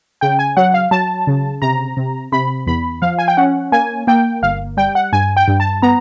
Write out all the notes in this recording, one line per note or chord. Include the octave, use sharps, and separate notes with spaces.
C#3 G5
G#5
F#3 F#5
F5
F#3 A5
C#3
C3 A#5
C3
C3 B5
E2 B5
F3 F5
G#5
G5
C#4 F#5
A#3 G#5
A#3 G5
G1 F5
G3 G5
F#5
G2 G#5
G5
G2
A5
B3 A#5